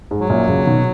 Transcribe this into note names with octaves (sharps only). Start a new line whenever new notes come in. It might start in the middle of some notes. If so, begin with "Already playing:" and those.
G#2
F#3
F#2 A#2
A#2 C#3
B2 D#3